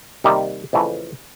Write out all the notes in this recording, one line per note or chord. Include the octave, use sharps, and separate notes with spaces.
C3 D#3 G3 A#3 D#4
F2 C#3 E3 A3